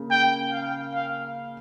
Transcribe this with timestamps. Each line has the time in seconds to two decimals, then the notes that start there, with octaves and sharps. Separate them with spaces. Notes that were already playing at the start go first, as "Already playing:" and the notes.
Already playing: C#3 A#3
0.11 G5
0.52 F5
0.94 F5